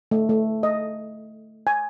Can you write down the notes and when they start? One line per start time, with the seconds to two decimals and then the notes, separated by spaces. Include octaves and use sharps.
0.11 A3
0.29 A3
0.63 D#5
1.67 G#5